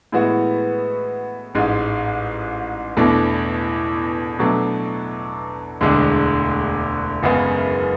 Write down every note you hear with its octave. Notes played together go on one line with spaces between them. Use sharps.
A2 E3 G#3 B3 F#4
A1 G#2 G#3
E2 B2 A3 D4
B2 F#3 A3 D4
E1 D2 D3 G#3 D4
F#1 F#2 C#3 G#3 B3